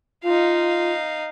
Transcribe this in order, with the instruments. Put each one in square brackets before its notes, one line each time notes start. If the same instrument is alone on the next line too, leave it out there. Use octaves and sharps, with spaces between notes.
[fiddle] D#4 F5 [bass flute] F4